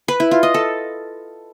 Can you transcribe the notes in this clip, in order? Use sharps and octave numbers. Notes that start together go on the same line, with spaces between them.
B4
E4
F4
D#5
A4